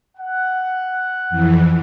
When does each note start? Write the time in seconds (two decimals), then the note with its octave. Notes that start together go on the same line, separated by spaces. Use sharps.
0.18 F#5
1.30 F2 E3